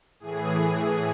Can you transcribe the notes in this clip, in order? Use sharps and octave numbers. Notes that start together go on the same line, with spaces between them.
A2 E3 G#4